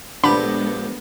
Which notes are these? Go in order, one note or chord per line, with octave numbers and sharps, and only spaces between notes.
A#1 G#3 B3 D4 G4 A4 B5